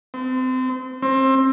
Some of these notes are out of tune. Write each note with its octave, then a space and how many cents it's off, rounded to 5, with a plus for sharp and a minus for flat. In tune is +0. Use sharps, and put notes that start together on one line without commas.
C4 -30
C4 +25